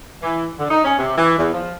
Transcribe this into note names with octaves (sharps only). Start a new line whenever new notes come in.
E3
D3
D#4
C#4
C3
E3
E2
F3